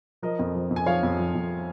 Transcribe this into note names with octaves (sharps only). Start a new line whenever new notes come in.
F3 A#4 D#5
F2
F3
F2
G#5
F3 C#5 F5
F2
F3
F2